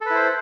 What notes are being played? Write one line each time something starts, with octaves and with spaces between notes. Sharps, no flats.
E4 A4 B4 C5